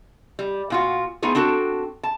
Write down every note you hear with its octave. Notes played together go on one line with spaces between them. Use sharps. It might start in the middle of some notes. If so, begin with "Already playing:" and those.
G3
A#2 F4 F#4
A3 B3 D#4 F4 G#4
C4 D4 F#4 A4 G5
A5